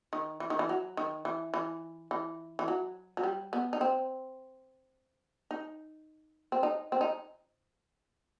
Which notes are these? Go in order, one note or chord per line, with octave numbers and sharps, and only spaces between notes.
D#3
E3
D#3
E3
F#3
D#3
E3
E3
E3
E3
F#3
F#3
G3
B3
D#4
C4
D#4
C4
D#4
C4
D#4